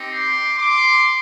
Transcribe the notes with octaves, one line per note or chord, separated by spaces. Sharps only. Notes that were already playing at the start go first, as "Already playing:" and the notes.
Already playing: C4 D#4 G4
C6 D6
C6 D6